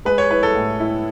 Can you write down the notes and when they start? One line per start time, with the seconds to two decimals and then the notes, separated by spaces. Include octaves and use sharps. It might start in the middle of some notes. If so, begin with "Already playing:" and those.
0.05 G#3 B4
0.18 C#5
0.31 E4 B4
0.43 A4
0.55 A2
0.80 E4